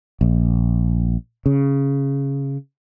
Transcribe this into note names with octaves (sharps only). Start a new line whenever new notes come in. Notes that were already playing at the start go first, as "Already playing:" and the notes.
A#1
C#3